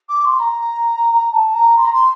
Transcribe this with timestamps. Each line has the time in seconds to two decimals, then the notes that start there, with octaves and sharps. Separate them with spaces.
0.09 D6
0.25 C6
0.39 A#5
1.32 A5
1.54 A#5
1.77 C6
1.85 A#5
1.93 C6